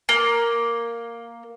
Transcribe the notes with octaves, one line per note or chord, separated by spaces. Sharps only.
A#3